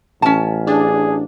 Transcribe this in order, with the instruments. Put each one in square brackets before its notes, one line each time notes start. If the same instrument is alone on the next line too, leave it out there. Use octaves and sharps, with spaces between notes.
[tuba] A1 [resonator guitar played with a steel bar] C#4 A5
[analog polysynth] D4 [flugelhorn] G#4